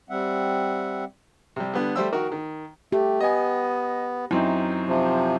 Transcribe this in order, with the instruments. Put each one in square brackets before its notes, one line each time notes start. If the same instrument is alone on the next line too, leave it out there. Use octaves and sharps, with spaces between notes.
[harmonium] G3 C4 E5 F#5
[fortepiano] C3 G3
D3 G3 B3
G3 A3 C5 E5 G5 E6
D#3 F#4 A#4
D#3
[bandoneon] A3 [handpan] G4
[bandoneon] B3 [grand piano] D#5 G#5
[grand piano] F#2 C4 D#4 [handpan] E4
[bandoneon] C3 F3